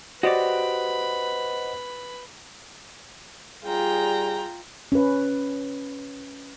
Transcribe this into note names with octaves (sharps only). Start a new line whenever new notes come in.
F#4 G4 B4 C5 D5 D#5 F#5 B5
G3 F4 G#4 G5 A#5
C#4 B4